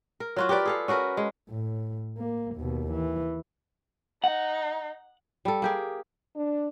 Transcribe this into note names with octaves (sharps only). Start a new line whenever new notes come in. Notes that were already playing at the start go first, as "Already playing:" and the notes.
A#4
F#3 F4 F#4
G4 A#4 B4 D5
G#4 A4 F5
C#4 F#4 A#4 B4
G#3
A2
A#3
D#2 B2
E3
D#4 F#5
G3 A4
A#3 G4 G#4
D4